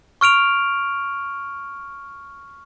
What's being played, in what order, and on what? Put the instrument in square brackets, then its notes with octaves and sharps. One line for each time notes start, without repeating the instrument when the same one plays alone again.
[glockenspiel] C#6 F6 D7 F7